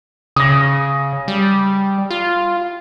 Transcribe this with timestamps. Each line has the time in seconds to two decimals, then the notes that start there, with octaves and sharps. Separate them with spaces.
0.36 C#3 D#6 A#6
1.28 G3
2.10 F4